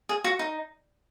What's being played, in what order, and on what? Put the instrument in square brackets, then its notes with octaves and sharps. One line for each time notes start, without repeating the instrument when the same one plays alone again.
[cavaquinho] G#4
F#4
D#4